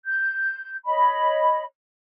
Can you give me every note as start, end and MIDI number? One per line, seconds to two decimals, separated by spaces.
0.05 0.75 91
0.86 1.62 73
0.86 1.62 75
0.86 1.62 83